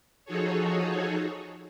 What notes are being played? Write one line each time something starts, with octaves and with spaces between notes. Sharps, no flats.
F3 D#4 F#4 G#4 A4 C#5